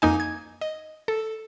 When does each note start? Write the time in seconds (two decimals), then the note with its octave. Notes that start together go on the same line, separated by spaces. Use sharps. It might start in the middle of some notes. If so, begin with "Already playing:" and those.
0.02 F2 A#3 D#4 G#5
0.20 G#6
0.61 D#5
1.08 A4